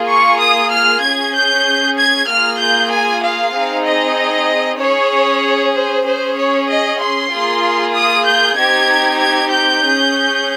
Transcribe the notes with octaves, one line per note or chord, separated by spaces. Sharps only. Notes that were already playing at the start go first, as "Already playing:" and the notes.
Already playing: A#3 F4 G#4
C#6
D#6
F6
C#4 G#4 G#6
G6
G#6
A#3 F4 G#4 F6
G6
G#5
F5
C4 D#4 G#4
D#5
C#4 G#4 C#5
C5
C#4 G#4 C5
C#5
D#5
C6
A#3 F4 G#4
D#6
G6
C4 D#4 G4 G#6
G#6
G6
C#4 G#4